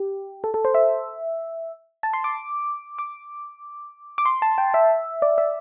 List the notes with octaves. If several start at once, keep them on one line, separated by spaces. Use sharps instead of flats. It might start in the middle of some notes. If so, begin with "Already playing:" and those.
Already playing: G4
A4
A4
C5
E5
A5
C6
D6
D6
D6
C6
A5
G5
E5
D5
E5